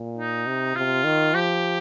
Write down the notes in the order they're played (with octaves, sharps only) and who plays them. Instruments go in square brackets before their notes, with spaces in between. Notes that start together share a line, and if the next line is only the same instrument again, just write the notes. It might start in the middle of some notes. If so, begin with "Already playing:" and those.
Already playing: [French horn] A#2
[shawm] D#4
[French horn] C3
[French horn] C3 [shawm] F4
[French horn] D#3
[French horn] F3 [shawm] G4